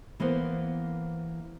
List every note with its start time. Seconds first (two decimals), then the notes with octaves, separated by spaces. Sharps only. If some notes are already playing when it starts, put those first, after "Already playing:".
0.20 E3 A#3 B3 C5